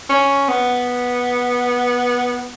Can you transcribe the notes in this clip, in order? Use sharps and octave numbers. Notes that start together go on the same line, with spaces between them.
C#4
B3